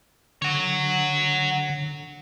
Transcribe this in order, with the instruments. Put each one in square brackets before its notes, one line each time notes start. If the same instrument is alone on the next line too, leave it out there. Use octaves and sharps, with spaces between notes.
[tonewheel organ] D3 [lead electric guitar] C#5 F#5